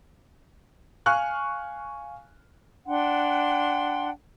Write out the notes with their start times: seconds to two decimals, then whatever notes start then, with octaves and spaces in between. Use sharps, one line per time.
1.06 F5 G#5 C#6 F6 F#6
2.86 D4 F#5 G5 C6